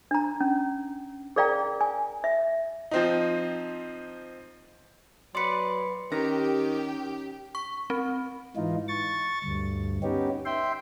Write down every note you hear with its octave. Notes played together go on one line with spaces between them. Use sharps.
D4 A#5
C#4
G#4 A#4 D5 F5 G5 A#5
G#5
E5
F3 C4 D#4
F#3 B4 D5 C6 C#7
D#3 C#4 G4 A#5
C#6
C4
G#2 E3 D#4 F4
C#6 A6
D2 G2
B3 C#4 D#4 G4
E5 G5 C6